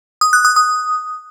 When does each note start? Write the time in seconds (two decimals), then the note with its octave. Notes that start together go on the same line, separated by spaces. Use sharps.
0.21 D#6
0.33 F#6
0.45 D#6
0.56 D#6